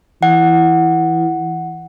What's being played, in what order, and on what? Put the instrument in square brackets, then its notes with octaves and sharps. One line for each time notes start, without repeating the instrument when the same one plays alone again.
[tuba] E3 [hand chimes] F#5